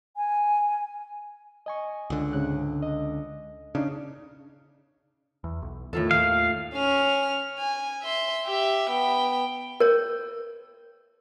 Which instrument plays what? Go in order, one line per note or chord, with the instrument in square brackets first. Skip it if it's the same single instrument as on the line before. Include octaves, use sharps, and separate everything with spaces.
[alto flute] G#5
[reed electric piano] D#5 G#5 C#6
[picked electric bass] C#2 D3
[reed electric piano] G#2 C#3 F#6
D#5
[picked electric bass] C#3 [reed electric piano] D4 D#4
[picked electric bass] E2
B1
[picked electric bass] E2 D#3 [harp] A2 F4 A4
[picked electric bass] D#2 D#3 [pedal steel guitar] F5
[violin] C#4 F6
G#5
E5 C6
G4 E5
B3 G5
[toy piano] A#4 C#5